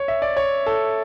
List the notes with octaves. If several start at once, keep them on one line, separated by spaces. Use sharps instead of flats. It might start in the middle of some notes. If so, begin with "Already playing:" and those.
Already playing: C#5
E5
D5
C#5
A4